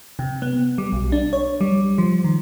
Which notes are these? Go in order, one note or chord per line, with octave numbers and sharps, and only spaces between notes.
C3
B3
G3
B1
D4
C#5
G3
F3
D#3